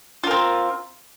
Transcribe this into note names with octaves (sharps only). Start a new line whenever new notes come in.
C4 F4 A#4